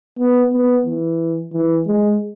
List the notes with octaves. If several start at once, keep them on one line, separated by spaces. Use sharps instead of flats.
B3
B3
E3
E3
G#3